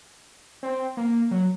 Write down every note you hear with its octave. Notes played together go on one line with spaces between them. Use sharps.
C4
A#3
F#3